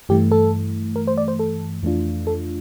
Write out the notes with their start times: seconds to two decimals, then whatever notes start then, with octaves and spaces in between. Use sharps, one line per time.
0.09 G2 E3 A3 G4
0.31 A4
0.96 A#4
1.07 C5
1.18 D5
1.28 C5
1.39 A4
1.83 F2 E3 A3 D4 F4
2.27 A4